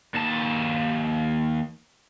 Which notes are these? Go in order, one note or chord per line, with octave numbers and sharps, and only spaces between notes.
D#2 A5